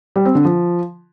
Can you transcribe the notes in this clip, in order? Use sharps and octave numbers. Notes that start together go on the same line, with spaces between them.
G3
C4
D3
F3